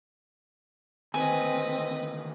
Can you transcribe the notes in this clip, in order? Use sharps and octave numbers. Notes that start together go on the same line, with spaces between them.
D2 D#3 C4 B4 D#5 G#5